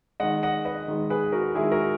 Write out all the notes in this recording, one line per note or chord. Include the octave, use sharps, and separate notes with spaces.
D#3 G#3 D#5 F#5
D#5 F#5
B4 D#5
D#3 G#3
G#4 B4
F#4 A#4
D#3 G#3 E4 G#4
F#4 A#4